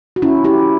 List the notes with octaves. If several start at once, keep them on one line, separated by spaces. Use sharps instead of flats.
F#4
C#4 E4
E4 G4